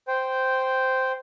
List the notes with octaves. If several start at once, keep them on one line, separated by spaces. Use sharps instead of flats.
C5 G5